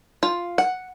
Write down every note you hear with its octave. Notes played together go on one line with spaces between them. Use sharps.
F4
F#5